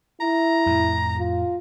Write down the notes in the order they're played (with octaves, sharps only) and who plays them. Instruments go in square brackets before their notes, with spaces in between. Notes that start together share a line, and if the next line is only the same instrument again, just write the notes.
[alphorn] E4 [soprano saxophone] A#5
[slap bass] F2 A2
[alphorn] F4